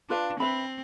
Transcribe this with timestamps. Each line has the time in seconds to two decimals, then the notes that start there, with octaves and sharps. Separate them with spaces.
0.10 D4 F4 B4 F5
0.40 C4 B4 E5 B5